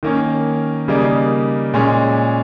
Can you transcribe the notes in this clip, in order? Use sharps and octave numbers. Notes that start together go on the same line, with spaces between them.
D#3 A#3 C#4
C#3 G3 A#3 D#4
A#2 G#3 C#4